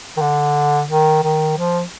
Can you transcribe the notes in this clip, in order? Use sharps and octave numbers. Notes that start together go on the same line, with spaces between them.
D#3
D3
D#3
D#3
F3